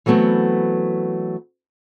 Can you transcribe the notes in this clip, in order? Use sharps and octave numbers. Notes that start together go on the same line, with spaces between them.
E3 F#3 A3 B3 C4